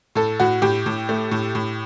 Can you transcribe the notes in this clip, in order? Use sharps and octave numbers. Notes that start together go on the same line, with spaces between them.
A2 A4
A2 F#4
A2 G4
A2
A3
A2
A2